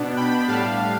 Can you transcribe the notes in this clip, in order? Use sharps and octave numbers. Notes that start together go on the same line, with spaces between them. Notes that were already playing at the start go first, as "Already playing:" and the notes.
Already playing: B2 B3 D4
G5 B5
A2 G3 D4 F5 A5